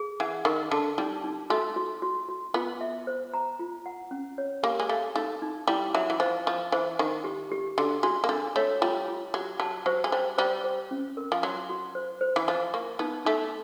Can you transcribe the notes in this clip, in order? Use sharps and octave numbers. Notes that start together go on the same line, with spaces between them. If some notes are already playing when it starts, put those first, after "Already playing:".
Already playing: G#4
E3 F#5
D#3 A#4
D3 A5
G3 D#4
D#4
A3 F#4
F#4
F#4
F#4
B3 F4
E5
C5
A#5
F4
F#5
C#4
C#5
A#3 G4
G#3
A3 F5
A3 D#4
D#4
G3 E4
F#3 E5
E3
F3 C5
F3 C#6
E3 C5
D#3 C#6
G4
G4
D3 F#4
G#3 F#4
A#3
A3 D4
A3 C#5
G3 F4
F4
F#3 G4
F#3 A5
F#3 C5
G#3
G3 C5
G3 C5
C5
C#4
A#4
F3
F#3 F#4
F#4
C5
C5
E3
F3 C5
A#3 C#6
B3 D#4
A3 D#4